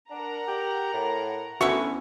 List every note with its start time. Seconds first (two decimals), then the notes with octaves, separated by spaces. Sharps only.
0.10 D4 A#4 F#5 A#5
0.48 G4
0.93 A2
1.61 D2 B3 C#4 E4 F#4 E5 C#6